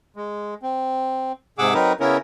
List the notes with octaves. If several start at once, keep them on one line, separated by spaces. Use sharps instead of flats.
G#3
C4
G#2 C3 G#4 F#5 D6 E6
F#3 C4 D#4 A#4 B4
C#3 B3 C#4 E4 A#4